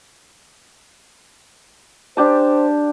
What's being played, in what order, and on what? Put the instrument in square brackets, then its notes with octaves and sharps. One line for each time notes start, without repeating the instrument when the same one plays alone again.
[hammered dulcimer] D4 G4 A5 [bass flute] C5